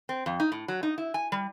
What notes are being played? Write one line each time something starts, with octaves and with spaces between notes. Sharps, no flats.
C4
F2
D#4
A2
F#3
D#4
E4
G#5
G3